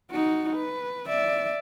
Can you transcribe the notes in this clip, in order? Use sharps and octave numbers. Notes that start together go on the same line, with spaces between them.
D#4 F#4
B4
D5 E5